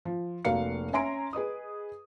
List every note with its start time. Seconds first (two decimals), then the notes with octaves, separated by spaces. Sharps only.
0.05 F3
0.45 F1 A#3 F#4 F5 C#7
0.93 C#4 E5 G#5 A#5 C6 D7
1.33 G#4 B4 D#5 D#6